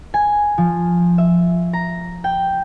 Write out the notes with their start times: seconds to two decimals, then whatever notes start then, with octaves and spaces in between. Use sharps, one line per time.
0.14 G#5
0.58 F3
1.18 E5
1.73 A#5
2.24 G5